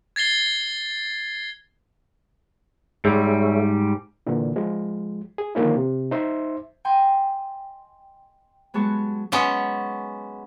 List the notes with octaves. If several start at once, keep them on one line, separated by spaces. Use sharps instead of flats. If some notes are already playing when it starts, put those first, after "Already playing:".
G#6 A6 C7 G7
G#2 G3 G#4 C#5 E5
A#2 D3 E3
F3 G#3
G#4
D3 D#3 F3 A#3 C#4 E4
C3
D#4 C5 E5 C6
D#5 G5 G#5 C6
F#3 G#3 B3 A5 C#6
F#3 G#3 B3 C#4